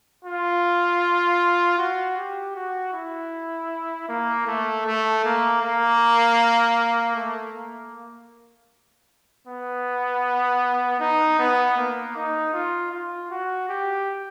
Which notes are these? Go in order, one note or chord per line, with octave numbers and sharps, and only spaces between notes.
F4
F#4
G4
F#4
E4
A#3
A3
A3
A#3
A#3
A3
A#3
B3
D#4
B3
A#3
D#4
F4
F4
F#4
G4